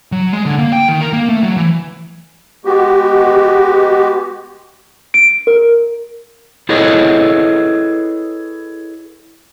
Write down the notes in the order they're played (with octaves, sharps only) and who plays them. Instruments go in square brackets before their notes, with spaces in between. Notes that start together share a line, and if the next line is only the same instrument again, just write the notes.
[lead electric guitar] F#3
G#3
D3
A#3
G5
D#3
A#4
A#3
A3
F#3
E3
[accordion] G#3 B3 F#4 G4
[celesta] D7
A#4
[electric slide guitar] E4 G#4 A4 B4 C#5 D#5